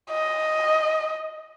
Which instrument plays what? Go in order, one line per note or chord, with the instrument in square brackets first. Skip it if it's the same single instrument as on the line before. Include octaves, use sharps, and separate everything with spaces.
[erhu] D#5